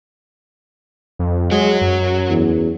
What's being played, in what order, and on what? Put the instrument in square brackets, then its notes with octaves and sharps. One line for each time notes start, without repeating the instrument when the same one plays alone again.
[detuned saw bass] F2
[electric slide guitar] F#3 F#4 [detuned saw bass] G#3
[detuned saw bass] F#2
[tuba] E2